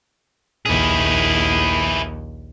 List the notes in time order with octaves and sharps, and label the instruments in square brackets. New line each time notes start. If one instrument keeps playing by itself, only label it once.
[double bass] A#1 D#2 [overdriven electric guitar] E4 G#4